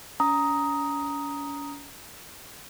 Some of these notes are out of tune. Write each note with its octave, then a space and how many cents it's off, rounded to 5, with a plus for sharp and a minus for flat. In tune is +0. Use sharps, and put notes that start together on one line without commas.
C#4 +40 A#5 +0 D#6 +10